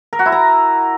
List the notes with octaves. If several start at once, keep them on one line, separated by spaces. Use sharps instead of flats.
A#4
F#4
E4
A#5